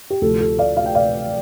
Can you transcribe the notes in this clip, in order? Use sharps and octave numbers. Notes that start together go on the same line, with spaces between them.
G4
D2 C3 F3 A4
A4
D5 F5
F5
G5
D5 F5